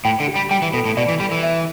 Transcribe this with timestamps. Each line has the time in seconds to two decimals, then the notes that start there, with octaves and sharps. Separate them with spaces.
0.05 A2 G5
0.20 D3
0.28 G4
0.36 G3
0.51 G3 G5
0.62 E3
0.74 B2 A4
0.85 A2
0.97 B2 D5
1.09 E3
1.20 G3 B5
1.32 E3
1.43 E5